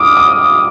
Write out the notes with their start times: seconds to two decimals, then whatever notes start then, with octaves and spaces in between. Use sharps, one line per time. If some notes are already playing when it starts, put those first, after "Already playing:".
Already playing: D6 D#6 F6
0.17 D#6